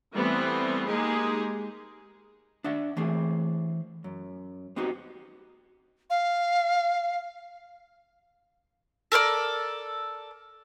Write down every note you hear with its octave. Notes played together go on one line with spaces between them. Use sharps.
E3 G3 A3 B3 C4
G#3 A#3 D#4 G4 G#4
D4 E5 F#5
E3 A3 C4 G#4
F#2
B3 C4 D#4 F#4 G4
F5
A4 A#4 C5 D5